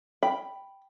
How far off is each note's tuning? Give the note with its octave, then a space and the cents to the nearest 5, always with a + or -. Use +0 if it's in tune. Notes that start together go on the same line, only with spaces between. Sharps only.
G5 +0 B5 +0